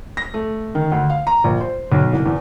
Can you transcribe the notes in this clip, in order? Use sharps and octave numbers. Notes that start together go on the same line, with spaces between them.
A#6
A3
D#3
D2
F5
A#5
A#1
C5
B1
C2
E2